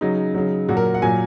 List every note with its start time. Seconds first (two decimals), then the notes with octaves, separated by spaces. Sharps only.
0.01 C#3 F#3 D#4
0.35 C#3 F#3
0.69 A#2 F#3 F#4
0.77 A#4
0.95 F#5
1.02 A#2 F#3 G#5